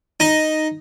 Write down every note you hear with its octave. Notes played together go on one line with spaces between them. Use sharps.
D#4